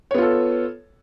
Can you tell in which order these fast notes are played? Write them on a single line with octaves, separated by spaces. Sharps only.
C#5 B3 F4 A4